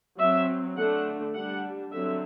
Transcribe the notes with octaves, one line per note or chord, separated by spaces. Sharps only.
F#3 C4 E5
D3 A3 D4 F#5
G3 D4 F#5
D3 F#3 C4 E5